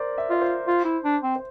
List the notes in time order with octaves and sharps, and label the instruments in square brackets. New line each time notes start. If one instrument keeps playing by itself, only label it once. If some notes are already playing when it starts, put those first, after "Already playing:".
Already playing: [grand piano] A#4 C5 D5
E5
[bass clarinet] F4 [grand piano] D5
[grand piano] C5
[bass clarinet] F4
E4
D4
C4
[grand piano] C5